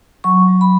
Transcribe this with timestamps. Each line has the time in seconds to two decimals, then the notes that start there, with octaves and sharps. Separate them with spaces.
0.24 F#3 C#6
0.48 F#3
0.61 B5